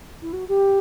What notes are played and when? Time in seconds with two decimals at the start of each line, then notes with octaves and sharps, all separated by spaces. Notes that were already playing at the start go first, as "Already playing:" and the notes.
0.22 E4
0.33 F#4
0.48 G4